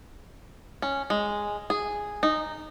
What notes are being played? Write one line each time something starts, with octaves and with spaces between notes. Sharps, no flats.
C#4
G#3
G#4
D#4